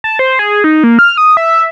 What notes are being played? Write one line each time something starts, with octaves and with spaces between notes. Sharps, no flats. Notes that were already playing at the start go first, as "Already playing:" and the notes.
A5
C5
G#4
D#4
A#3
F6
D#6
E5